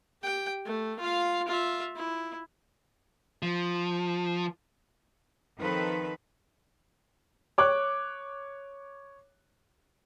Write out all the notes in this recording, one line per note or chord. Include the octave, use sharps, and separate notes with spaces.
G4 G5
A3
F4 F5
F4 E5
E4
F3
D#3 F3 C4 A4 B4
C#5 D6 F#6